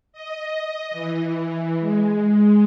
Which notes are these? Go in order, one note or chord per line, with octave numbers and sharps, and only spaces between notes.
D#5
E3
G#3